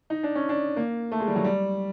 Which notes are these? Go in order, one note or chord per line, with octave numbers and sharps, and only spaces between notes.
D#4
D4
C#4
D4
A#3
A3
G#3
G3
F#3
G3